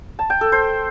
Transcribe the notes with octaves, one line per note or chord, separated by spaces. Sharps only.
A5
G5
A4
C5